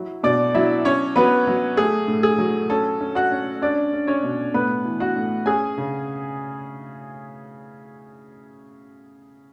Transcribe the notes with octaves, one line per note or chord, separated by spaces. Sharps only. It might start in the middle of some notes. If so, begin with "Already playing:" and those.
Already playing: F#3 E4
B2 D5 D6
F#3 E4 E5
C#4 C#5
F#3 B3 B4
F#3
A3 G#4
A2
G#4
F#3
C#4 A4
C#4
F#4 F#5
C#4
C#4 D4 D5
C#4
C#4 C#5
B2
A2 B3 B4
E3
F#4 F#5
A2
C#4 G#4 G#5
C#3